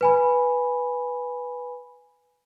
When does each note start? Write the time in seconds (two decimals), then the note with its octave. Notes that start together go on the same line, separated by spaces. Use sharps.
0.01 B4 G#5 B5